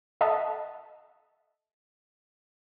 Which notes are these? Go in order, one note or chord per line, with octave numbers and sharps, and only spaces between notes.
A4 D#5 E5 F#5 A5